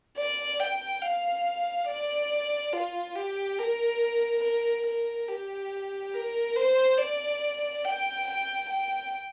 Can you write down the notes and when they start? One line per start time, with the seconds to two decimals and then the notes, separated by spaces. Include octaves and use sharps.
0.17 D5
0.59 G5
1.02 F5
1.87 D5
2.73 F4
3.15 G4
3.58 A#4
4.43 A#4
4.86 A#4
5.28 G4
6.14 A#4
6.56 C5
6.98 D5
7.84 G5
8.27 G5
8.69 G5